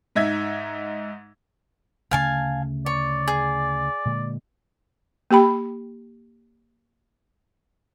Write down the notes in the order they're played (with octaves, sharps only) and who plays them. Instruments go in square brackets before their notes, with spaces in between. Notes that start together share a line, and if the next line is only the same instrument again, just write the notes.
[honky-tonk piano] G#2 D#4 E5 G#6
[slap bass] D2 C#3 A3 [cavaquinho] F5 G#5 A5
[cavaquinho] C#5 [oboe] D5
[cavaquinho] G#4
[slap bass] A#2 D3 G#3
[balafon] A#3 G4 G5 B5